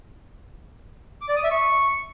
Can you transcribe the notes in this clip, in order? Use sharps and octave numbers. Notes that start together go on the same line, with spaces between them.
D6
D5
D#6
E5
C#6